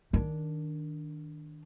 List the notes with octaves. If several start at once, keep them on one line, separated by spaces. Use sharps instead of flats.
D#3 D4